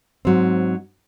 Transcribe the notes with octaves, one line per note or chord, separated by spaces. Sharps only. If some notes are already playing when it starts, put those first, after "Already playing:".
G#2 F#3 C4